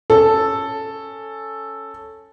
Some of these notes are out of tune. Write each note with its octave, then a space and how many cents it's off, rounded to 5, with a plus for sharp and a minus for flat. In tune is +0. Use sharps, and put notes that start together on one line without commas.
C#4 +0 A4 +0